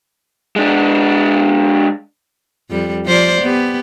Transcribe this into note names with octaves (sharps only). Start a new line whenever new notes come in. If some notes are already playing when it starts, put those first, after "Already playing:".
G#3 D4
F2 G3
F3 C5 D5
B3 G4